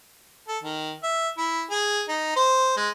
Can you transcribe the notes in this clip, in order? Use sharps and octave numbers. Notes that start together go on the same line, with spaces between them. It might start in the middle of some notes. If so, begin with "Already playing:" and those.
A4
D#3
E5
E4
G#4
D#4
C5
G#3